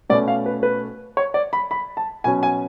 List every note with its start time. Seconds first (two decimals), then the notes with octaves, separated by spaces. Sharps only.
0.09 B2 A3 C#4 D5
0.28 F5
0.46 B4
0.63 B4
1.17 C#5
1.34 D5
1.53 B5
1.71 B5
1.97 A5
2.24 B2 F#3 C#4 G#5
2.43 G#5